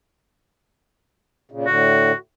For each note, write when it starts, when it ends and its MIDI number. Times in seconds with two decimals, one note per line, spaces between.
1.51 1.66 46
1.51 1.66 49
1.66 2.12 45
1.66 2.12 50
1.66 2.14 66